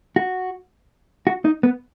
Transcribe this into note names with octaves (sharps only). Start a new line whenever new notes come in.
F#4
F#4
D#4
B3